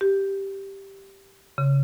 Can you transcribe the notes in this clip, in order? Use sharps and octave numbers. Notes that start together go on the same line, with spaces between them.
G4
C#3